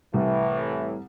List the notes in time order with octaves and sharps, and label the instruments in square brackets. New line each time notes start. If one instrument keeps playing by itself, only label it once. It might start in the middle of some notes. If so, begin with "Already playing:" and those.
[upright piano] C2 [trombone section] A2 E3